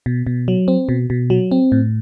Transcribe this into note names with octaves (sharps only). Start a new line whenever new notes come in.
B2
B2
F#3
C4
B2
B2
F#3
C4
A2